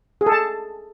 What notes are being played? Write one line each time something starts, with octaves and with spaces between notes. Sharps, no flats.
G#4
A4
A5